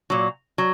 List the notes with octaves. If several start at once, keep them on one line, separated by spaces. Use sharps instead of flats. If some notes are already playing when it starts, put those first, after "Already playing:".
A#2 F#3
F#3